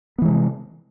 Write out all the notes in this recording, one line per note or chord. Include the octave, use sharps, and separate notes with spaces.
C3 E3 G#3 B3